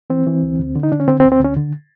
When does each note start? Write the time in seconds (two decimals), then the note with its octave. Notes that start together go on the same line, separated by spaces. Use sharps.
0.10 E3 C4
0.27 E3
0.43 D2
0.59 D2
0.76 D3
0.83 D#4
0.92 D3 D4
1.00 C#4
1.08 D3 C4
1.20 C4
1.24 D2
1.32 C4
1.40 D2 C#4
1.57 D3